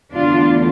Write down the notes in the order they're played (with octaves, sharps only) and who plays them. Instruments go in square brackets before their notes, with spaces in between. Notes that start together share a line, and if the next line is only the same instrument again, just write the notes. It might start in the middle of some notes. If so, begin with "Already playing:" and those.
[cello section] E2 D3 A3 D4 F4